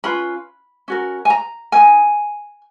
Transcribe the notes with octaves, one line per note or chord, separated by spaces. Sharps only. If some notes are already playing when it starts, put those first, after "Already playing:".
C#4 F4 B4 B5
C#4 F#4 A#4
G#5
A#5
D#4 A#4 G#5